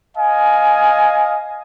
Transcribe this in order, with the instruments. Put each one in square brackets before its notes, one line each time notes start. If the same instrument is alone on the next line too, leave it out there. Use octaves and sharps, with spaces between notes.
[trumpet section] D#5 F5 G#5